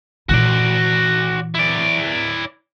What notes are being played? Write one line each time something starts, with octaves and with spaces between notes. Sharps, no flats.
A#2 E3 F#4 D5
E4 D5